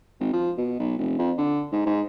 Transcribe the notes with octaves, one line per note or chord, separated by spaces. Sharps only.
G#1
F3
B2
B1
F1
F2
D3
G#2
G#2